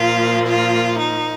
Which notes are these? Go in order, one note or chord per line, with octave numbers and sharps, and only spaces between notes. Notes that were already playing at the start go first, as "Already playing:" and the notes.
Already playing: A#2 F3 A#3 F4
F4
D#4